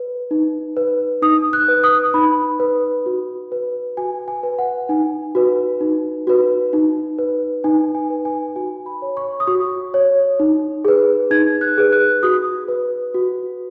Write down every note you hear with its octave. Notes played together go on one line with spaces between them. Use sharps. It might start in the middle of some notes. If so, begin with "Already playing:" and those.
Already playing: B4
D#4
B4
D#4 D#6
F#6
B4
D#6
D#4 B5
B4
F#4
B4
F#4 G#5
G#5
B4
F#5
D#4 G#5
F#4 B4
D#4
F#4 B4
D#4
B4
D#4 G#5
G#5
B4
G#5
F#4 G#5
B5
C#5
C#6
D#6
F#4 C#6
C#5
D#4
G#4 B4
D#4 G#6
F#6
G#4 B4
F#6
F#4 D#6
B4
F#4